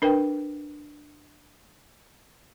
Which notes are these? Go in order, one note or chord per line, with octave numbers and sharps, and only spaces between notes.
D4 A#4 B4 G5